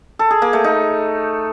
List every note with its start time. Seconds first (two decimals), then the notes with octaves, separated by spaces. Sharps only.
0.19 A4
0.31 G#4
0.42 A#3
0.53 A3
0.64 D#4